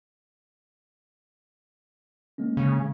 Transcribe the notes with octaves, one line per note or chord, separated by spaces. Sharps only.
G#3 A#3 C#4
C#3